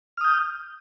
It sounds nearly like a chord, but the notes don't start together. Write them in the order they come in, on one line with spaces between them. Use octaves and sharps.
F6 D#6 G6